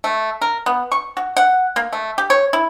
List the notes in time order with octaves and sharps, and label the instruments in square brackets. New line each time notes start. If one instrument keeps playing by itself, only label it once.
[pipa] A3
A#4
B3
C#6
F#4
F#5
A#3
A3
G4
C#5
E4